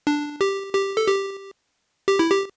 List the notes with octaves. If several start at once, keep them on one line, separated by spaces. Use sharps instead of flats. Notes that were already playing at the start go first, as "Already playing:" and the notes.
D4
G4
G4
A4
G4
G4
E4
G4